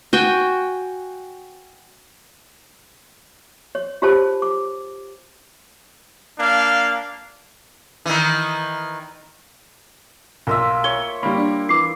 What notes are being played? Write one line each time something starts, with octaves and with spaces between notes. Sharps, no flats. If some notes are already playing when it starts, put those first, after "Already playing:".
F#4 G5 G#5
C#5
F4 G4 G#4 C5 C#5 A5
D6
A#3 D4 F5
D#3 E3
B1 A#3 F4 E5
C#5 G7
G3 A#3 B5
D4
E3 D6 C7